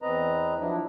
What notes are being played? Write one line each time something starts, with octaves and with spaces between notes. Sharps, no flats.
E2 C4 B4 D#5 A#5
F3 F#3 D4 E4